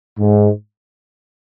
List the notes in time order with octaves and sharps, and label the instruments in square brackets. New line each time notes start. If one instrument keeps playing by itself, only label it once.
[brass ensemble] G#2